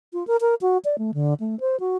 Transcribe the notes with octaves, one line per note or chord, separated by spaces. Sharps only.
F4
A#4
A#4
F#4
D5
A3
D3
A3
C5
F#4